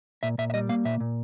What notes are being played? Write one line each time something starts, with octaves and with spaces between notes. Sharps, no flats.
A#2 E5
A#2 E5
E5
G3 D#5
A#3 F5
A#2 E5
A#2